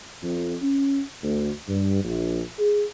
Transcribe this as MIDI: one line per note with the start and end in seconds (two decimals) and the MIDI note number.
0.23 0.54 41
0.62 1.00 61
1.22 1.49 38
1.67 2.01 43
2.04 2.40 34
2.58 2.82 68